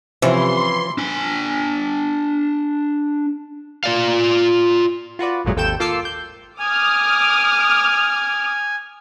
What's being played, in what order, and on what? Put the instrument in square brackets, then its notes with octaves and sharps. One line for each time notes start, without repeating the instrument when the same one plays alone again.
[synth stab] C3 [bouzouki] E3 [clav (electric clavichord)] F3 C#4 E4 [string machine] C6
[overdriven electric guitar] D4 G#5
[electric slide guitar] F4 D5 F5
[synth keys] F4 F#4 B4 D5
A1 F#2 A#2 F#3 G#3 A3
G#1 D#2 A4 G5 G6 E7
A#3 F4 A4 D6 E6 C7
G6
[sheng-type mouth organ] G#5 [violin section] D6 D#6 F6